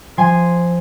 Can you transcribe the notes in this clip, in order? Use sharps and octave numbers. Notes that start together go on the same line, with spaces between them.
F3 G#5 C6